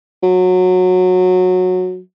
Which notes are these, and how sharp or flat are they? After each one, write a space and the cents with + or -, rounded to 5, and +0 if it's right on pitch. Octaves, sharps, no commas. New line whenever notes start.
F#3 -15